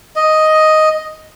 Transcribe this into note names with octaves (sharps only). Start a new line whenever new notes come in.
D#5